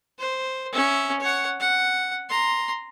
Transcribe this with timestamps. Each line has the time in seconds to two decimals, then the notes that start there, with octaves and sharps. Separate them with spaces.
0.19 C5
0.73 C#4 E5
1.20 C#5 F#5
1.60 F#5
2.29 A#5 C6